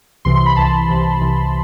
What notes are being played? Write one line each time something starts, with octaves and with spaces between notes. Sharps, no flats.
C2 C3 E3 C6
C6
B5
C2 C3 E3 A5
C2 C3 E3
C2 C3 E3